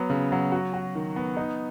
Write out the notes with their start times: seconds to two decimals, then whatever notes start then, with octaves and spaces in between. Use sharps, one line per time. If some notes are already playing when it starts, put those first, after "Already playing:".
Already playing: F#3 B3
0.10 C#3
0.32 F#3
0.52 F#4
0.74 F#4
0.95 D#3
1.16 B3
1.37 D#4